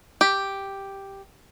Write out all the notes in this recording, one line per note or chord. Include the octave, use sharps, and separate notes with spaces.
G4